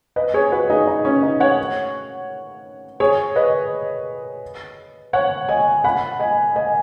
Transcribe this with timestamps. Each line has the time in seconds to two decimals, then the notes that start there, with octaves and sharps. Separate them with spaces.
0.16 B4 D#5
0.34 G#4 C#5
0.52 F#4 B4
0.70 D#4 G#4
0.87 D#4
1.05 C#4
1.23 D#4
1.40 C#5 F#5
3.00 G#4 C#5
3.36 B4 D#5
5.13 C#5 F#5
5.49 D#5 G#5
5.84 F#5 B5
6.20 D#5 G#5
6.56 D#5 G#5